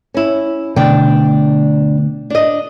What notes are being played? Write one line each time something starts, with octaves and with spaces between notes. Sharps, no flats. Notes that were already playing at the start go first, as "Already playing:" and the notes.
C#4 E4
B2 D3 A3 D4 G5
D4 D#5